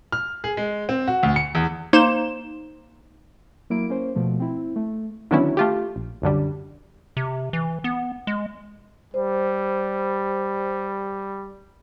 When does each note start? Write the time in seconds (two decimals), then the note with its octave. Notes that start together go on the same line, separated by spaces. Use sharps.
0.12 F6
0.44 G#4
0.57 G#3
0.89 C4
1.08 F#4
1.23 D2
1.36 C#7
1.55 E2
1.93 A#3 D#4 C5 C6 E7
3.70 F#3 A#3 E4 D7
3.89 A#3 C#4 C5
4.15 B2 F3 A3
4.40 C4 E4
4.76 A3
5.31 D3 D#3 F#3 B3 C#4 E4
5.57 A3 F4 G4
5.96 A#1
6.22 C2 F#2 D3 G3
7.17 C3
7.53 E3
7.84 B3
8.27 G#3
9.14 G3 C5